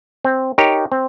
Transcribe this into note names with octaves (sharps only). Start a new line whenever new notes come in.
C4
D#4 G4 A#4 C#5
C4